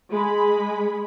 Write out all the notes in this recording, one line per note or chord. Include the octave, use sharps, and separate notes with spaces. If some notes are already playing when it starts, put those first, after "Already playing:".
G#3 B5